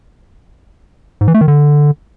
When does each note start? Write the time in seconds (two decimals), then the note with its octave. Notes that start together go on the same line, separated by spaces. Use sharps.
1.21 G#2
1.28 E3
1.34 A3
1.41 D#3
1.48 D3